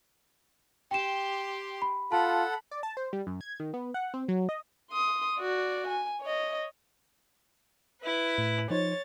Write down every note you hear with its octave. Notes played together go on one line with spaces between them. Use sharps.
G4 G5 C6 E7
B5
F4 A4 F#5 A5 B5
D5
A5
C5
G3
F#2
G#6
D#3
B3
F#5
C4
F#3
D#5
C6 D#6
F#4 D5
G#5
C#5 D#5
E4 B4
A2
F3 D#4 C5 C#5 A6